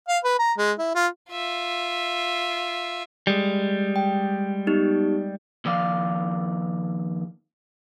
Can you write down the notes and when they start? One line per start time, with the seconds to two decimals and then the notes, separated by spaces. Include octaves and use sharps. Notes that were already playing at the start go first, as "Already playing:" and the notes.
0.08 F5
0.24 B4
0.39 A#5
0.58 G#3
0.79 E4
0.95 F4
1.30 F4 E5
3.27 G3 G#3
3.96 G5
4.67 B3 D#4 G4
5.65 D#2 F3 D5 F5